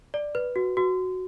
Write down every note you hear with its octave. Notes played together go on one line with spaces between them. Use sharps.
D5
B4
F#4
F#4